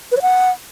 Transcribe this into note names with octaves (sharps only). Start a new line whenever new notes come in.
B4
C#5
F#5